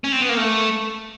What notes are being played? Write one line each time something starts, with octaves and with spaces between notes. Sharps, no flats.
C#4
C4
B3
A#3
A3